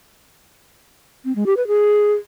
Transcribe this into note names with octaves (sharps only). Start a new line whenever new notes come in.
C4
G#3
G4
B4
G#4